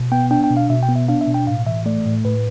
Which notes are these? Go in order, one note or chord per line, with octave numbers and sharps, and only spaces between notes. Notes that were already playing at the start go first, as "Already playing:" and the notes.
Already playing: B2
B3 G5
D4 G5
G5
B2
F5
B2 E5
G5
B3
E5
D4 F5
E5
B2
G5
A2 F5
E3 E5
A3 D5
A2
A2 B4